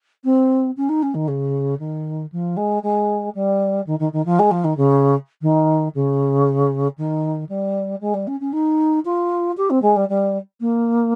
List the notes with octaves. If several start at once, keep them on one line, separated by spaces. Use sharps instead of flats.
C4
C#4
D#4
C#4
D#3
C#3
D#3
F3
G#3
G#3
G3
D#3
D#3
D#3
F3
G#3
F3
D#3
C#3
D#3
C#3
D#3
G3
G#3
G3
C#4
C#4
D#4
F4
G4
C4
G#3
G3
G3
A#3